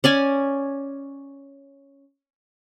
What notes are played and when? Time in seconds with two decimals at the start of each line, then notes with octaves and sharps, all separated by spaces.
0.04 C#4 D5 G#5